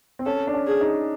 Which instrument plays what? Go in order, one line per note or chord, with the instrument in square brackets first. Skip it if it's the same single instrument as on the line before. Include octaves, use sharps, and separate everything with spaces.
[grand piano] C4
[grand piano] C#4 [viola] A4
[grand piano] D4
C#4
[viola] G#4
[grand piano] D#4